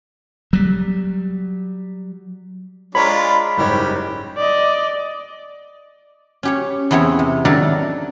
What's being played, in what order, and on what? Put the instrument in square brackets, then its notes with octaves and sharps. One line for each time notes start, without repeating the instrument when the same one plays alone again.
[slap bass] F#3 G3
[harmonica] G#3 D4 F4 [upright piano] C#5 A#5 C#6 [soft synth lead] B5
[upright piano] F#1 G#2 C#5 [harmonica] G3
[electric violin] D5 D#5
[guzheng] C#4 G4 C#5
E2 B3 C4 E4 C#5
C3
D#3 F#3 D4 A4 A#4